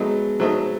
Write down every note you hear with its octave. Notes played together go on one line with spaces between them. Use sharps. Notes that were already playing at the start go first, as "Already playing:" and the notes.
Already playing: F#3 G#3 A3 B3 D#4
F#3 A3 D#4